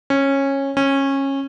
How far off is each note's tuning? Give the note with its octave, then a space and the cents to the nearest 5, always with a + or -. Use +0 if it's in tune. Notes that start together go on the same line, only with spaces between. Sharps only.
C#4 -15
C#4 -20